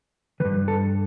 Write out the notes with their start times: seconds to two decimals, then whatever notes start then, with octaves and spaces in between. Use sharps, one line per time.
0.40 D#3 B4
0.45 G2
0.68 A4